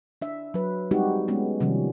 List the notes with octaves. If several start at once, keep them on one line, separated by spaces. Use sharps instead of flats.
D4 E5
F#3 B4
G3 G#3 C4 D#4 F#4 G4
G#3 A3 B3 C#4
C3 D#3 F3 G3 C#4